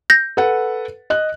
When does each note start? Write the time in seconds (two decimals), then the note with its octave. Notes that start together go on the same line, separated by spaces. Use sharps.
0.10 G6 A#6
0.37 A4 B4 F#5
1.10 D#5 F#6